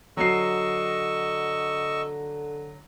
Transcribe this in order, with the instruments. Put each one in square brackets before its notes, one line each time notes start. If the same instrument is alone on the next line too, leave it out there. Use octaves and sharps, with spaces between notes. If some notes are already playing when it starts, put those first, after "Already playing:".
[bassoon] D3 [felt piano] F#3 C7 [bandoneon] D#5 C#6 E6